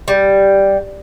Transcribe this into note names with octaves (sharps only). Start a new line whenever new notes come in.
G3